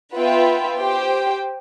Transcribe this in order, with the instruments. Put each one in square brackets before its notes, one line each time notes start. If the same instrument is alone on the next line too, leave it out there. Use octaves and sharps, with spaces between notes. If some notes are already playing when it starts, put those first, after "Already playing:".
[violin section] B3 F4 B4 E5 G5
G4 C5 G5